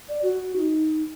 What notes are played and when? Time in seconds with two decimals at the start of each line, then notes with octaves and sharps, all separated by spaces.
0.09 D5
0.23 F#4
0.56 D#4